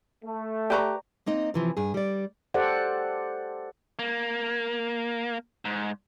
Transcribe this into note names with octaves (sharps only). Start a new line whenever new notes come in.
A3
G4 B4 D5 A#5 C#6
A#3 C4 D#4 D#5
C3 E3 F3
G2 G#4
G3 D5
G4 A4 C5 D5 F#5
A#3
G#2